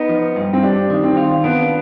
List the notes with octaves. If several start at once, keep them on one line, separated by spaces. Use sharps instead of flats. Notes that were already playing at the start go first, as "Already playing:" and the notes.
Already playing: B3 D#4
F3
G2
C4
G3 D4
D#3
C4
F4
B3 D4